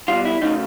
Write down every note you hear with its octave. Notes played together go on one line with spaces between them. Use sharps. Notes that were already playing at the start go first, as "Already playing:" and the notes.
B2 G3 F4
E4
F#2 C#3 F#3 A3 D#4